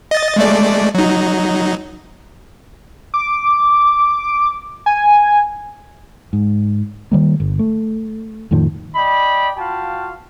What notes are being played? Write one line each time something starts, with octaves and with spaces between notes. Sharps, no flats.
D#5 A6
G#3 A3 D5
F#3 D#4
D6
G#5
G#2
D#3 G3 A#3
G1
A3
F2 A2 D#3 F3
D5 D#5 G5 B5
F4 F#4 F5 G5 A5